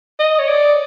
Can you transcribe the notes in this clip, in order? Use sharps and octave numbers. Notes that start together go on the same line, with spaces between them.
D#5
C#5
D5